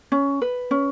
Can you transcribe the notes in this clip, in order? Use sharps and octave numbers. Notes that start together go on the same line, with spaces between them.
C#4
B4
C#4